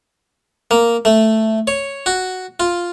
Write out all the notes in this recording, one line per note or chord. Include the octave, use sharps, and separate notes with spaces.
A#3
A3
C#5
F#4
F4